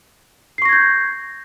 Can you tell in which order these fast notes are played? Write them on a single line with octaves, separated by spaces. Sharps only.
C7 C#6 A#6 G#6 G6